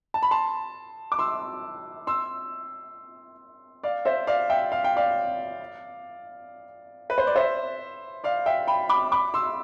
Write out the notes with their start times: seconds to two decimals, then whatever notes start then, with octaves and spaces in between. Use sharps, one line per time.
0.14 A5
0.23 B5
0.31 A5 C6
1.12 D6
1.19 C6 E6
2.07 C6 E6
3.83 D5 F5
4.05 C5 E5
4.27 D5 F5
4.50 E5 G5
4.72 F5
4.84 G5
4.96 D5 F5
7.10 B4
7.18 C5
7.27 D5
7.36 C5 E5
8.24 D5 F5
8.46 E5 G5
8.67 G5 B5
8.89 B5 D6
9.12 B5 D6
9.34 C6 E6